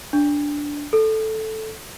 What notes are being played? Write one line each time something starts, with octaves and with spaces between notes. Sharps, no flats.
D4
A4